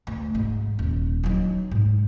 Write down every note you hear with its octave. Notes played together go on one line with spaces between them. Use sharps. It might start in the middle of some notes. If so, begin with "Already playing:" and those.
D2
G#2
D#1
F#3 D#4
G#2